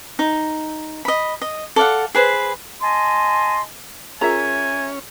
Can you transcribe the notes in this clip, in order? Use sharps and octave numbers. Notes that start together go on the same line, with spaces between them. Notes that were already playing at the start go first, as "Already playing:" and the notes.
D#4
D#5 B5
D#5
A4 D5 F5 F#5
G#4 B4 C5
D#5 G#5 A5 C6
C#4 F4 G#4 A#4 E5 G#5 A#5